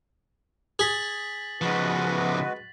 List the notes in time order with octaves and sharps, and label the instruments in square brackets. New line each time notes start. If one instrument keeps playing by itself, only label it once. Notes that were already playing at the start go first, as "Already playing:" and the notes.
[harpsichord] G#4 [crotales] A6 B6 F#7
[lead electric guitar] C#3 F3 [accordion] G#3 F#4 B4